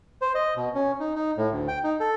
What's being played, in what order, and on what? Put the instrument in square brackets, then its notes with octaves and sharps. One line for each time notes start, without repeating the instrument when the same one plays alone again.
[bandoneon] C5
D#5
B2
C#4
D#4
D#4
A2
D2
G5
D#4
A4